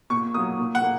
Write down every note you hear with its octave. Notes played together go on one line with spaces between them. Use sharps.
A#2 C#6
F#3 A#3 D#6
A#2
F#5
A#3